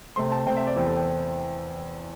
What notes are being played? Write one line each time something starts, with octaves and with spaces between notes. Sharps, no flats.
C3 A3 C4 C6
A5
C3 A3 C4 G5
E5
D5
E2 E3 C4 G4
A4
G5